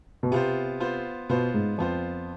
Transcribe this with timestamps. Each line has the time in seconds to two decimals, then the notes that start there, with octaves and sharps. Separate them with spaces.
0.23 B2
0.31 C3 B3 F4 C5
0.80 B3 F4 C5
1.29 B2 B3 F4 C5
1.54 G#2
1.78 F2 B3 F4 C5